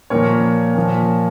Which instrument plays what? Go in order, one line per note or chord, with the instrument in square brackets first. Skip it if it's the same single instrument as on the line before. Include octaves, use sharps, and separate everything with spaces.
[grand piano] A#2 F3 A#4 C#5
A#2 F3